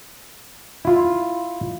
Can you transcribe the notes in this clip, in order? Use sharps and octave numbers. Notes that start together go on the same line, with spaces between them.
E4 F4